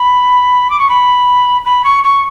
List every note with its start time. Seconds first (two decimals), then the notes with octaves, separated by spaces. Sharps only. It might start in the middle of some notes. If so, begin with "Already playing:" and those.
Already playing: B5
0.70 D6
0.79 C#6
0.89 B5
1.65 B5
1.84 C#6
2.03 C#6